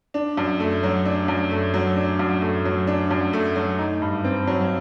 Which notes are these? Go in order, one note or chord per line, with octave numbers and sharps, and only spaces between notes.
D4
F#2
A3
F#3
D4
F#2
A3
F#3
D4
F#2
A3
F#3
D4
F#2
A3
F#3
D#4
G2
C4
F#3